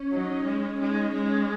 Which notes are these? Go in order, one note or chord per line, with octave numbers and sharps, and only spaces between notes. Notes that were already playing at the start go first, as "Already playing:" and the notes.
Already playing: C#4 C#5
F#3 D#4 D#5
G#3 C#4 C#5
G#3 D#4 D#5
G#3 C#4 C#5